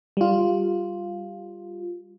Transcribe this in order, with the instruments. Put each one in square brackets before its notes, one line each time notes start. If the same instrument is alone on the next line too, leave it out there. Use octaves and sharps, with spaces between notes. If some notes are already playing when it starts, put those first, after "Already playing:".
[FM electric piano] G3 F4